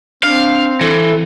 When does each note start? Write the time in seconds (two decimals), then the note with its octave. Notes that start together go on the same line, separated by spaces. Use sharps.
0.24 C4 D4 F5
0.81 E3 A4